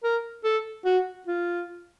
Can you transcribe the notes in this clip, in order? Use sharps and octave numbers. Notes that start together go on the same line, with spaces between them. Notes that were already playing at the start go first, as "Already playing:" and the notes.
A#4
A4
F#4
F4